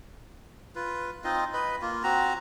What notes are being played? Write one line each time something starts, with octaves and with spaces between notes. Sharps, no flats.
F4 B4
C4 D#4 F4 D#5
B4 D#5 B5
A#3 F4
C4 F#4 A#5